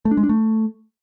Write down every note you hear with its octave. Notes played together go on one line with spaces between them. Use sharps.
A3
D4
G#3
D4
A3